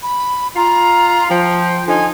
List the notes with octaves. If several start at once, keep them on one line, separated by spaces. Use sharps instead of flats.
B5
F4 A#5
F3 G5
D3 F3 D#4 G#5